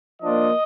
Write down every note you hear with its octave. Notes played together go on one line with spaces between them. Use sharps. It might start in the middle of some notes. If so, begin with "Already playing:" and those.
F3 A#3 D4 F4 D#5